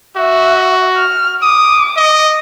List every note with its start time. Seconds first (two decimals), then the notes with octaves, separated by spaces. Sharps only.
0.16 F#4 E5
0.97 F6
1.42 D6 D#6
1.97 D#5